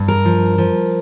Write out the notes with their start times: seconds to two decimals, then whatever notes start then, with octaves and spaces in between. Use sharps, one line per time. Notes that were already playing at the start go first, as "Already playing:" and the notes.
Already playing: G2
0.08 A#4
0.25 F3
0.58 F3